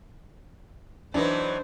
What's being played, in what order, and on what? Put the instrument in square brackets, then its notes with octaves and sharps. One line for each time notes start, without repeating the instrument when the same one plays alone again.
[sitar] E3 F#3 D#4 [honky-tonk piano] D4 B4 [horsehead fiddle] C5